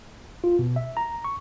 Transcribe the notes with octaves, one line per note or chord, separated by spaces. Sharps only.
F4
B2
E5
A#5
C#6